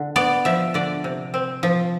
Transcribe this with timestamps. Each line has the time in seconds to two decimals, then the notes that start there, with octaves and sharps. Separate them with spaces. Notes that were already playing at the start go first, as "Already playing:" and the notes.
Already playing: D3
0.16 B3 D5
0.45 F3 E5
0.74 D3 D5
1.04 C3
1.34 C4
1.63 F3